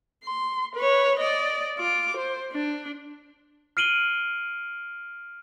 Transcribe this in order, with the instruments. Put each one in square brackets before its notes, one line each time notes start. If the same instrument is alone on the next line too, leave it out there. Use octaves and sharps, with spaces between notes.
[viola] C6
B4 C#5
D5 D#5
F4 D6
C5
D4
[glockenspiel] F6 C7 D7 D#7 F#7 G7